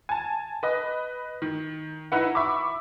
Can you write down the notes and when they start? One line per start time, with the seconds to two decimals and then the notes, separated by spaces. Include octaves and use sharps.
0.09 G#5 A5
0.63 B4 D#5
1.42 D#3
2.12 D#4 E4 B4 F#5
2.35 E5 B5 C#6 D6